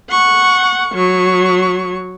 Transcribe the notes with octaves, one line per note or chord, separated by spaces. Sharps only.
F#5 C#6
F#3 C#6